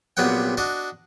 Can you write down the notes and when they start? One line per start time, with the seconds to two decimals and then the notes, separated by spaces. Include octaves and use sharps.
0.17 A#1 C3 F#3 B3 F#5 G5
0.57 D4 F#4 D#5